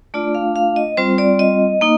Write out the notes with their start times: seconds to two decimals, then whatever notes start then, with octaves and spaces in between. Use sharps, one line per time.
0.14 A3 D4 F4 D5
0.35 F5
0.56 F5
0.76 D#5
0.97 G3 C4 F4 C5
1.18 D5
1.39 D#5
1.81 A#3 D#4